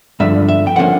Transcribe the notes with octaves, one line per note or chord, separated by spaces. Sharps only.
G2 D3 F3 E5
E5
G5
D3 F3 A#3 C#4 F#5